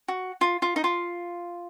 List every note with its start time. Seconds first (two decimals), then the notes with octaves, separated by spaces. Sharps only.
0.08 F#4
0.41 F4
0.62 F4
0.76 D#4
0.84 F4